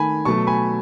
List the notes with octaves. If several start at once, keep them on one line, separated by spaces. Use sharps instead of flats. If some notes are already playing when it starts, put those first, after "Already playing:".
Already playing: D#3 A3 G#5 B5
B2 F#3 A3 A5 C#6
G#5 B5